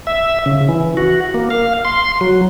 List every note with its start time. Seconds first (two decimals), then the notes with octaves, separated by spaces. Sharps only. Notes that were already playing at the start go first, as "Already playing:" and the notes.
0.07 E5
0.46 C#3
0.69 E3
0.97 F#4
1.34 A#3
1.50 F5
1.85 C6
2.21 F#3